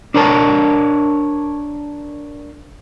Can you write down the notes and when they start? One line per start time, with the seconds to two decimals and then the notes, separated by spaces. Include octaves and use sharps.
0.14 D4 A#4 C#5 A5